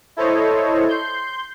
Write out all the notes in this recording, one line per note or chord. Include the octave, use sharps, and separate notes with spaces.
E4 A4 C5 C#5 D#5
C6 G6